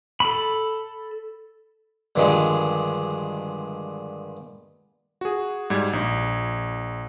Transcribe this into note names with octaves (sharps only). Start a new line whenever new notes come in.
A4 B5
G2 D3 D#3 F3 G3 G#3
F#4 G#4
G#2 G3 G#6
A#1